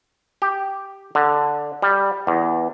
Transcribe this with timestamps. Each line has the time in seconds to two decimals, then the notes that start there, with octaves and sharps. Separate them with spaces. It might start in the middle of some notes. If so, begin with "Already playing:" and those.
0.42 G4
1.15 D3
1.82 G3
2.27 E2